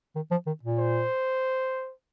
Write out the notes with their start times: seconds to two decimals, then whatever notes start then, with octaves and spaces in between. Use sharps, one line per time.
0.15 D#3
0.31 F3
0.47 D#3
0.63 A#2
0.78 C5